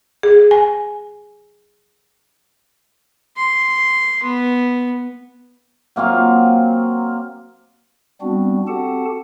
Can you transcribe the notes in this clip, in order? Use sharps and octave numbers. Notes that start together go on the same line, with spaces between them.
G#4
G#5
C6
B3
F#3 A#3 C4 F5
G3 B3 C4 D4 F#4
C4 F#4 G4 A4 F#5 A5